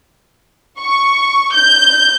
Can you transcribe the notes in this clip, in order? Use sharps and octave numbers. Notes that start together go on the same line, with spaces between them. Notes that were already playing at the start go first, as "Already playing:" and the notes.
C#6
G6